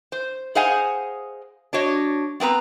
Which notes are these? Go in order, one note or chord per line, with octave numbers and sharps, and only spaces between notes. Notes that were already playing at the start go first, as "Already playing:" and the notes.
C5
G#4 C5 D#5 F5 F#5 G#5
D4 F#4 C#5 D#5
B3 C4 B4 A#5